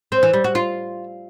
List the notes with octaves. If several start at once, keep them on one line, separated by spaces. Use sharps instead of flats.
C4
E3
G3
F#4
F4